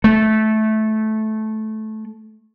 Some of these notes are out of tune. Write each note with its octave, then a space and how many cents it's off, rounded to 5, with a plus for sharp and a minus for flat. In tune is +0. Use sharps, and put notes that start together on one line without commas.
A3 -15